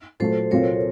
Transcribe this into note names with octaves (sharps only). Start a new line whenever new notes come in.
A#2 F#3 A3 A4 C5
C2 A#2 F#3 C4 F4 A#4 C#5